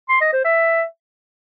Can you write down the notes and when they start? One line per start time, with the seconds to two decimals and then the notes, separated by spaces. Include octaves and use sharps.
0.09 C6
0.21 D#5
0.33 C5
0.45 E5